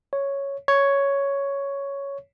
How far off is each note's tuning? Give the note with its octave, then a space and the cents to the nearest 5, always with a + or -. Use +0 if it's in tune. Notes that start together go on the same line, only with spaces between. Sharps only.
C#5 +0
C#5 +5